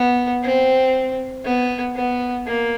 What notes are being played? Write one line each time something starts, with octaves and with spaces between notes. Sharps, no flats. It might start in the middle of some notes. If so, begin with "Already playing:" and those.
Already playing: B3
C4
B3
B3
A#3